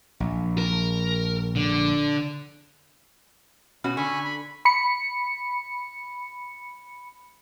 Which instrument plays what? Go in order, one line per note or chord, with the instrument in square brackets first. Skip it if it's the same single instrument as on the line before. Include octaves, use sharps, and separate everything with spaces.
[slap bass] A#1
[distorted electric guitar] A#4
D3
[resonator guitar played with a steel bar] B2 C#4 F#4
[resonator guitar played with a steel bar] D3 [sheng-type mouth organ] G#5 B5 C#6
[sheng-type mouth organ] B5
[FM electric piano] B5 C#7